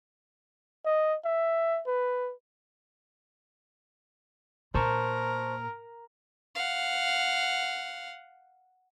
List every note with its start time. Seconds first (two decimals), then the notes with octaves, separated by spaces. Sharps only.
0.85 D#5
1.25 E5
1.86 B4
4.74 A#2 A#4 C5 A5 C#6
6.55 F5 F#5